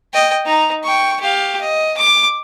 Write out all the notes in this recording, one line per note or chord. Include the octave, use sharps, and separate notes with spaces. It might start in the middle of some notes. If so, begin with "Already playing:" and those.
D#5 G5
D#4 A#5
G5 C#6
G4 F5
D#5
D6